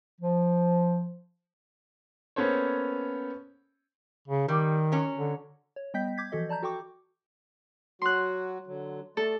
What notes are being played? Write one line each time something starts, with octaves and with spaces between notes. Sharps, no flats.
F3
A#3 B3 C#4 A4 C5 C#5
C#3
D#3 G3
F#3 C#4
D3
C#5
G3 B3 D#5 G5 G6 B6
D6 G6 G#6 B6
E3 F3 F#4 A4 D#5
D5 A5 A#5 G6
F#4 A4 G5 C#6 D6
F#3 F#4 C6 F#6
D3 F#3
A3 A4 D5